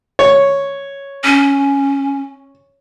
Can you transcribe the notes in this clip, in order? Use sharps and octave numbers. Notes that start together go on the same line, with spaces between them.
C#5
C#4